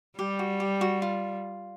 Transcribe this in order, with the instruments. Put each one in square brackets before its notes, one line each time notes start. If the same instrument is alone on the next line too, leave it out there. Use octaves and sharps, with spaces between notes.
[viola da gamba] G3 [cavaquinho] G4
[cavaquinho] F#4
G4
F#4
F4